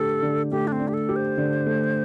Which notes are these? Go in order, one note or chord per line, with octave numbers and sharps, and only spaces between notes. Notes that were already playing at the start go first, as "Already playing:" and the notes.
Already playing: D3 A3 D4 G4 A4
D3
A3 G4
D4
C4
D4
G4
A4
G4
C5
D3
A3